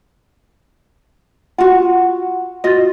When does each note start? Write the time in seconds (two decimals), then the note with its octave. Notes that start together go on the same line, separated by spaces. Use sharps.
1.58 F4 F#4 F#5
2.64 F4 F#4 D#5 A6